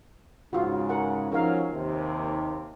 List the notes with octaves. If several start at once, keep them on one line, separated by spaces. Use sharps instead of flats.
G#2 C#3 F4 F#4
A#4 F#5
F3 F#3 C#4 D#4 A#4 F5
D#2 C3